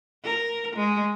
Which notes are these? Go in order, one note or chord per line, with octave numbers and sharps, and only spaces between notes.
A#4
G#3